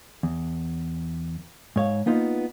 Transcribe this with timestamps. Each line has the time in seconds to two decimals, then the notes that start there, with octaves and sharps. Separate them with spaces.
0.23 E2
1.76 G#2 C#5 F5
2.06 A#3 B3 D#4 F4